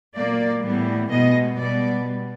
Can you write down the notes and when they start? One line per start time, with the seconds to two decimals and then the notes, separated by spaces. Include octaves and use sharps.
0.15 A#2 F#3 A#3 D5
0.64 A2 E3 G3 B3
1.11 B2 G#3 B3 D#5
1.58 B2 G3 B3 D5
2.05 G3